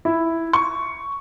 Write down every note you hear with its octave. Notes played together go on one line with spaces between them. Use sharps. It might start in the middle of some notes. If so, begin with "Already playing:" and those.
E4
C#6